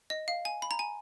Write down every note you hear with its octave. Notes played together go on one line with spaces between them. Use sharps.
D#5
F5
G#5
B5
A#5
G#5